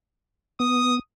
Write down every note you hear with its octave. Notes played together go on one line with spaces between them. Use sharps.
B3 D#6